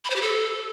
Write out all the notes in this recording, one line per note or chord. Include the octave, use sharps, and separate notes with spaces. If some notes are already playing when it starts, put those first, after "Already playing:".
B5
C5
G4
A4